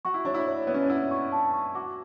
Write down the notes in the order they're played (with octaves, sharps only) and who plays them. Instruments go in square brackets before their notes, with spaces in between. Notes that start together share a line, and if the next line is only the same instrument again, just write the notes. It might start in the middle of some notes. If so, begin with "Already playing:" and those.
[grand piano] F#4 [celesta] C#6
[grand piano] E4
[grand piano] D4 [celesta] C#5
[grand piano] E4
[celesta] C#5
[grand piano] B3 [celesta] C#5
[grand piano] C#4
D4
[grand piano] E4 [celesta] F#5
[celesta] C#6
A5
C#6
[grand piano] F#4 [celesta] D6